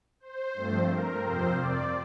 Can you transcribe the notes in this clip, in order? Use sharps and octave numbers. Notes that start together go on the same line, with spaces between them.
C5
G2 F3 A3 C4
A#4
F2 C3 F3 C4 C5
D5